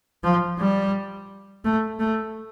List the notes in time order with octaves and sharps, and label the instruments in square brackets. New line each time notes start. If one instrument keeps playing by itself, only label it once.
[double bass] F3
G3
A3
A3